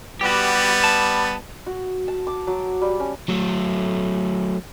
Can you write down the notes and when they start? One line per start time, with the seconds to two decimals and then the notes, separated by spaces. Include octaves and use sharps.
0.21 G3 B3 F#4 G4
0.84 A5
1.66 F#4
2.08 A5
2.27 D6
2.47 F#3
2.82 G3
2.99 C#4
3.29 F#3 A3